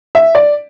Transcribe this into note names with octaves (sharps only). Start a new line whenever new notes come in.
E5
D5